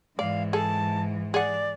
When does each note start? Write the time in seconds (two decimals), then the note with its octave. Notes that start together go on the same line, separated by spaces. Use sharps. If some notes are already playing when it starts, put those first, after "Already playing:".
0.19 G#2 E3 D5 F5
0.53 G#4 A4 A5
1.34 G#4 D5 F#5